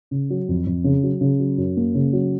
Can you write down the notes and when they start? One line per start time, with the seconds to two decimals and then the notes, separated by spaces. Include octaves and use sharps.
0.11 C#3
0.30 F#3
0.49 F2
0.67 F2
0.84 C#3
1.03 F#3
1.21 C#3
1.40 F#3
1.58 F#2
1.77 A#3
1.95 C#3
2.13 F#3